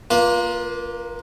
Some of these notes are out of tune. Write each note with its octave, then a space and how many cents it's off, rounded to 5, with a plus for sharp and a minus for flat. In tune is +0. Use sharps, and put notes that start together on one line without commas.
A#3 +0 F4 +0 B4 -35